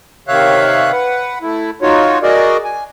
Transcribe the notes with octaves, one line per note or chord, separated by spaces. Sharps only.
C3 D#3 C#5 E5 F5 F#6
B4 F#5
A3 E4
D#4 F4 F#4 C#5
F#4 G#4 A#4 D5 D#5
G#5